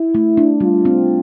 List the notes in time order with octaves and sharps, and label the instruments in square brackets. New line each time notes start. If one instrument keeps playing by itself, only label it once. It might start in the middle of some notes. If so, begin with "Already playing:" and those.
Already playing: [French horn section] E4
[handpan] A3
D4
[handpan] G3 [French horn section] F4
[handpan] C4